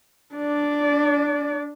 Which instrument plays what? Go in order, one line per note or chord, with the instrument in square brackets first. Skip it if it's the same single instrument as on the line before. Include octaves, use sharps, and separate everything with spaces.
[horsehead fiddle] D4 D5